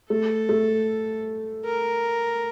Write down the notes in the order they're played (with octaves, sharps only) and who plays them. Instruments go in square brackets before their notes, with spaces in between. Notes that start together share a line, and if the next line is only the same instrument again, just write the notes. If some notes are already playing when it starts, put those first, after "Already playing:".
[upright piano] A3 [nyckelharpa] A4
[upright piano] A3
[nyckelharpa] A#4